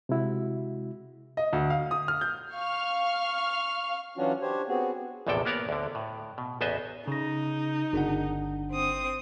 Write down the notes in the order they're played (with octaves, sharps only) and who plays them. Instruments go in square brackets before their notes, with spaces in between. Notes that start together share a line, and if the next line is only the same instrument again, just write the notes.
[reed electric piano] C3 G#3 E4 F#4
[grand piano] D#5
D2
F5
D#6
F6
G6
[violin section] F5 C#6 F6
[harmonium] E3 F#3 C#4 D4 F4 F#4
D4 G4 C5 C#5
B3 C4 F#4 G#4
[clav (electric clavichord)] A#1 E2 A2 C3 A4 G5
A#3 B3 A#4 C#5 D5
D2 D3
A2
B2
A1 E2 B3 C5 D#5 E5
[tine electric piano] C#3 A#6 [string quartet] D#4
[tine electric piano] G1 D4 F#5
[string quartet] C4 D#6